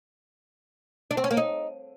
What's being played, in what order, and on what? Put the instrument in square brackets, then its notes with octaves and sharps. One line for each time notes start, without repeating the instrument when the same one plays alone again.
[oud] D4
C4
C#4
A#3
D#4